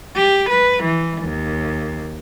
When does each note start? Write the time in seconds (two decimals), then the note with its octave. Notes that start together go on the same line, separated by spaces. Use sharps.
0.16 G4
0.50 B4
0.84 E3
1.22 D#2